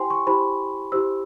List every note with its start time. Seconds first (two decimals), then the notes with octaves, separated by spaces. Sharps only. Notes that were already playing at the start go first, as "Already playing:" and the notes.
Already playing: E4 G4 C5 G5 G#5 C6
0.10 C#6
0.27 E4 G4 C5 B5
0.92 E4 G4 C5 E6